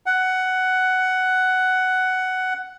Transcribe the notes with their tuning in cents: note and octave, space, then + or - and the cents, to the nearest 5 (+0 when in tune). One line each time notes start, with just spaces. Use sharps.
F#5 +10